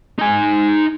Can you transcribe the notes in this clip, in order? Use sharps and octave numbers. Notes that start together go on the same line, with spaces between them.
D#4 G#5